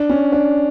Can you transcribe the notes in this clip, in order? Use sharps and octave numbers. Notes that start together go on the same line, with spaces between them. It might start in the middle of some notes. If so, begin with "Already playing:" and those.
Already playing: D4
C#4
D4